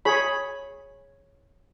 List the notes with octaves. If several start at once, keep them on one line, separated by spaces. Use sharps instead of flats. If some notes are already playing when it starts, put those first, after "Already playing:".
G#4 C#5 B5